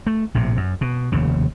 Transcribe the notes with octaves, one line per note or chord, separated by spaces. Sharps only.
A3
A#1 A2 C3
F#2
B2
F1 D#2 C#3